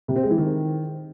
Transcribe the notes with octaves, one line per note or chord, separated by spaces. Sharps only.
C3
C4
G#3
E3
D#3